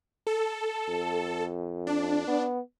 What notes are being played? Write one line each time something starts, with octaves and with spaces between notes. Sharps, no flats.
A4
F2
D4
B3